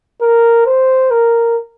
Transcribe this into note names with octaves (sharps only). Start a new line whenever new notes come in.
A#4
C5
A#4